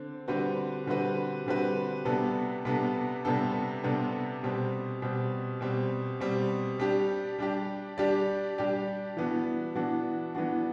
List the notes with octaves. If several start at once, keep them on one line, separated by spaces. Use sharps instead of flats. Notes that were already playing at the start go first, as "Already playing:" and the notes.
Already playing: D3 C4
D3 G3 C4 F#4 B4
D3 G3 C4 F#4 B4
D3 G3 C4 F#4 B4
C3 G3 B3 D4 A4
C3 G3 B3 D4 A4
C3 G3 B3 D4 A4
C3 G3 B3 D4 A4
B2 G3 C4
B2 G3 C4
B2 G3 C4
B2 G3 C4
G3 D4 G4 D5
G3 D4 G4 D5
G3 D4 G4 D5
G3 D4 G4 D5
E3 B3 D4 F#4
E3 B3 D4 F#4
E3 B3 D4 F#4